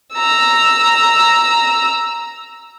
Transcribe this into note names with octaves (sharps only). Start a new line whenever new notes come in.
A#5 E6